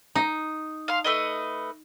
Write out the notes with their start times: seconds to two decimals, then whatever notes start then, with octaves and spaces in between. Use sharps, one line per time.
0.15 D#4
0.88 F5 C6
1.04 A3 B4 D#5